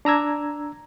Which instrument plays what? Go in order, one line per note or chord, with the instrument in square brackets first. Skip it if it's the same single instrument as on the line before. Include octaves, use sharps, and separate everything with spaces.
[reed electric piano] D4 A#5 E6 G#6